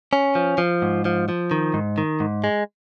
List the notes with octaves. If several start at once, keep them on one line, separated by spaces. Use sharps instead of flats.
C#4
F3
F3
G#2
F3
F3
D#3
G#2
D#3
G#2
G#3